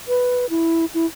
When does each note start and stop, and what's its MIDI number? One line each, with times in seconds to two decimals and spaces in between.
0.08 0.49 71
0.50 0.85 64
0.94 1.06 64